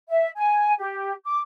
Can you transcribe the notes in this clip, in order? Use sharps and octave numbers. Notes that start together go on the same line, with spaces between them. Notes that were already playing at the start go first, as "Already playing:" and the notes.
E5
G#5
G4
D6